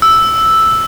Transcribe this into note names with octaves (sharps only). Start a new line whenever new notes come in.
E6